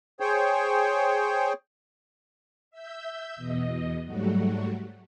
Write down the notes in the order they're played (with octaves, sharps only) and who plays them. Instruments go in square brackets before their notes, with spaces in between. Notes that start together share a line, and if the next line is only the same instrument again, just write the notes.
[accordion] G#4 C5 C#5 G5
[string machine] E5 E6 G6
E2 B2 D#5
G#2 F#3 G3 A3 F#4